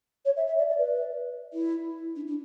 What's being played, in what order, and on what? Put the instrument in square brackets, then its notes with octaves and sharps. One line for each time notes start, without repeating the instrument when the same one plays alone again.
[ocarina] C#5
E5
E5
D5
D5
B4
E4
D4
D4